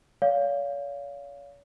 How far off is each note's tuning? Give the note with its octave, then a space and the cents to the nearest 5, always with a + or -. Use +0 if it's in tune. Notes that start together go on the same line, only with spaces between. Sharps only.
C#5 +40 F5 +0